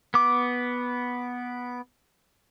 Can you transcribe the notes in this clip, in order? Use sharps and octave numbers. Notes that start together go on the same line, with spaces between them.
B3 D6